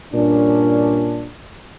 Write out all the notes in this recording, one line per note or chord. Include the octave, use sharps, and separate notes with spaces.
G2 A#2 C#4 D4